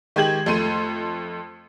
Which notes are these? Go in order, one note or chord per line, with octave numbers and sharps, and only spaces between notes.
D#3 G#3 G4 G#6 F#7
F2 A3 C6 D#7